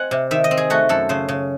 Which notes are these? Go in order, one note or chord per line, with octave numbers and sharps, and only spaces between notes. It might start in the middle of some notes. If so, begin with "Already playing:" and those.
Already playing: C4 D#5 F#5 G#5
C3
D#3 E5
D#5
C4
G#4
A3 F#4
F#2 A4
C#3 C5
C#3